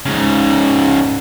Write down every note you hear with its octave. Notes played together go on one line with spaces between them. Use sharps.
G#2 C#3